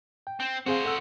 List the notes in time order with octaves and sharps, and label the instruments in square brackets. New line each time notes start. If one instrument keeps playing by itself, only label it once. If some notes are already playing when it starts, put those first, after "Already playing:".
[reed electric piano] G5
[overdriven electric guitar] C4
[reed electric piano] C4 G#4 F5 [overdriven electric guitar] F#4 C5
[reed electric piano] A4 F#5 E6